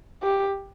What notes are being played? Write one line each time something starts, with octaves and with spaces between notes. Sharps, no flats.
G4